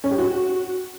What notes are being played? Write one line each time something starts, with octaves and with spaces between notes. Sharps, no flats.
C#4
G4
F#4